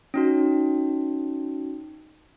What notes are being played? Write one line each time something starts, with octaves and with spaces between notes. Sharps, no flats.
C#4 D#4 F#4